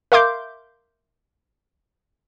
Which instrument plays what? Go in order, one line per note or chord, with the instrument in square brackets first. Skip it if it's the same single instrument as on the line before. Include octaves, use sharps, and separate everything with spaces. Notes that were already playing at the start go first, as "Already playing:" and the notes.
[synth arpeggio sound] A#4 E5 F5 C6 D6 G6